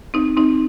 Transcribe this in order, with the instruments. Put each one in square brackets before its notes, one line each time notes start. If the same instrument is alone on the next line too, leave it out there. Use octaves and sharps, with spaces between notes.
[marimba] C4 D#4
C4 D#4